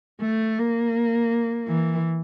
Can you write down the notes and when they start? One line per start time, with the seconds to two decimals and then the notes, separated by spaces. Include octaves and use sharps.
0.20 A3
0.58 A#3
1.68 E3